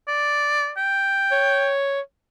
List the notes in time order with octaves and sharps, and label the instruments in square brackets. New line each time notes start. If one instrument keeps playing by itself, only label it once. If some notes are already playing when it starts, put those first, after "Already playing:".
[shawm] D5
G5
[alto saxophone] C#5